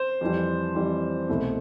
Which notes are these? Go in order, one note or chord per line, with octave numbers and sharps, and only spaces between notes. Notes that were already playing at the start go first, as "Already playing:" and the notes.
Already playing: C5
F2 E3 G3
F2 E3 G3
C2 B2 A3